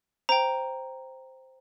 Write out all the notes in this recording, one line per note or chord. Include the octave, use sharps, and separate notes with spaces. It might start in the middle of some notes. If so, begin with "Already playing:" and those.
C5 G5 A#5